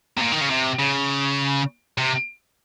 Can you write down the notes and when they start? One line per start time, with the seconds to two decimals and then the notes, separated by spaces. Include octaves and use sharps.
0.17 C3
0.21 A#2
0.32 D#3
0.41 C#3
0.50 C3
0.79 C#3
1.98 C3